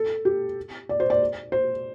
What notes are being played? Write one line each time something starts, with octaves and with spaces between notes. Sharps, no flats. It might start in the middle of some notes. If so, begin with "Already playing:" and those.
Already playing: A4
G4
D5
C5
D5
C5